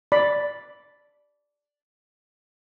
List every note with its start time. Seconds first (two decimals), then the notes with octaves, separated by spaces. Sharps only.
0.12 D5 B5